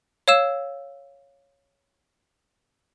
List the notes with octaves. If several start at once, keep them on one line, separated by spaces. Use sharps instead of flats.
C#5 F5 E6 E7